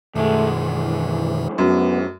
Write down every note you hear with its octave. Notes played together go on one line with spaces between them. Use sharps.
B1 F#2 B2 D#3 G#3 A3
E3
F#2 B3